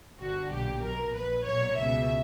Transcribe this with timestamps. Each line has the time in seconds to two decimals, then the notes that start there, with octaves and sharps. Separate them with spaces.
0.19 G1 G2 D3 F#4
0.51 B1 A#2 G4
0.82 B1 B2 A#4
1.14 A#1 A#2 B4
1.45 B1 A#2 C#5
1.77 C#2 B2 E5